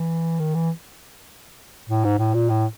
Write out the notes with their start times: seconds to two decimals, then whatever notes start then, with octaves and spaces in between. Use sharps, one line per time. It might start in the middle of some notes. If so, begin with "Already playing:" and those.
Already playing: E3
0.39 D#3
0.55 E3
1.89 A2
2.05 G#2
2.19 A2
2.34 A#2
2.49 A2